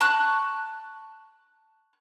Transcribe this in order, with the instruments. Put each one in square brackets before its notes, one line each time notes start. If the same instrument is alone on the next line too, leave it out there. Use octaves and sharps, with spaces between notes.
[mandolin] A5 C#6 F#6